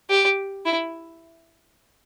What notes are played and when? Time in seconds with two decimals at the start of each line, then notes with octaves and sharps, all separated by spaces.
0.10 G4
0.66 E4